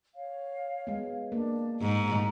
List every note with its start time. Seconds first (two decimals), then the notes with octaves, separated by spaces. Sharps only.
0.15 C#5 F5
0.87 G#3 B3
1.32 A#3 D4
1.81 G#2 A#5